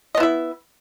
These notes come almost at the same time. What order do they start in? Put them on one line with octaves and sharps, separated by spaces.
D#5 B3 E4 E5